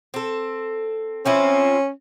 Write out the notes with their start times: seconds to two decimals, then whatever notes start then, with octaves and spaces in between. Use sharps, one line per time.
0.14 C4 A4
1.26 F3 C4 C#4 E4